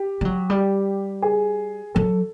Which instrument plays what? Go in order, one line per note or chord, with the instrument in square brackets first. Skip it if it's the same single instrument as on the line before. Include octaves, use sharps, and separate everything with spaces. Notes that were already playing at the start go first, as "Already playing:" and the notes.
Already playing: [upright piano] G4
[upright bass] G3
F#3
G3
[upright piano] G#4
[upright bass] F#3 [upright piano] A4